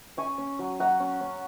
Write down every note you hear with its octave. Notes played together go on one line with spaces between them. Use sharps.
C#4 G#5 C#6
C#4
F#3
F#3 F#5 A#5
C#4
C#4